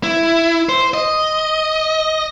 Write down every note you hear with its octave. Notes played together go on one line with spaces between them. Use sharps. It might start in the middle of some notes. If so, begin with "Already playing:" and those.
E4
C5
D#5